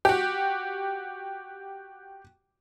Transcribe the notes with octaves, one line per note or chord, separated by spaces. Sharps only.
F#4 G4